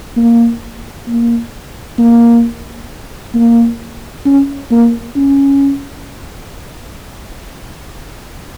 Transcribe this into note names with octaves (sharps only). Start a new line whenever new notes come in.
A#3
A#3
A#3
A#3
C#4
A#3
C#4